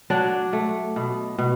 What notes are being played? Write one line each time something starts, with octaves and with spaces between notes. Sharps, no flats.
F#3 D4 D5
A3
B2
B2